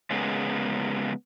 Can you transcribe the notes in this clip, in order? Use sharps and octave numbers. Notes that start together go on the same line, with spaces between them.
C#3 G#3 A#3 B3